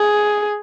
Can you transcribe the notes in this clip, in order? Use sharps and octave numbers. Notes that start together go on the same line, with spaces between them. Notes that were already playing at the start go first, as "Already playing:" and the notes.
Already playing: G#4